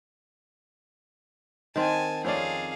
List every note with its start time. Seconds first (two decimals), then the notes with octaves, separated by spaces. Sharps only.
1.76 D#3 C4 G#5 A5
2.24 F2 C#4 G#4 D5 F5